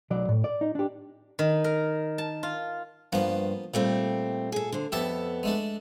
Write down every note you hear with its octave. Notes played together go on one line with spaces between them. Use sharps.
B1 F#3 D5
A2
D5
D#4
D4 G4
D#3
A#4
A5
F4
G2 F3 A#3 B3 C5
A#2 G3 A3 C4
G#4 A4
D3 C5
F2 B3 G4 A4 E5
G#3 A3 D4